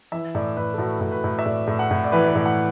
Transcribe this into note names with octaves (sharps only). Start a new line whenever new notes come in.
E3 E5
A2 D5
A2 B4
A4
A2 F#4
A2
B4
A2
E5
A2 D5
A2
F#5
A2
D5
E3 B4
D5
B4
A2
F#5